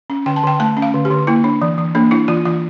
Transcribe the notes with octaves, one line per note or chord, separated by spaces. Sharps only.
C#4
D3 G5
A5
D3 G5
A3 A5
C#4
F5
D3
G4
D3
A#3 E4
D4
E3
E3
A#3 D4
D4 E4
E3 F4
E3 F4